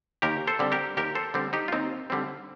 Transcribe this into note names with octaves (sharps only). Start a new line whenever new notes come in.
D#2 G4 A#4
A4 C5
D3 G3 C4
G4 A#4
D#2 G4 A#4
A4 C5
D3 G3 C4
D#4 G4
F4
D#2 C4 D#4
D3 G3 C4